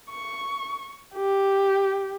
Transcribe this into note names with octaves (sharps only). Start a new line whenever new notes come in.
C#6
G4